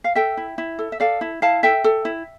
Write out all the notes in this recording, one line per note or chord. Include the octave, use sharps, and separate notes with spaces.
F5
A4 E5 G5
E4
E4
A4
E5
A4 D5 F5
E4
E4 F5 A5
A4 E5 G5
A4
E4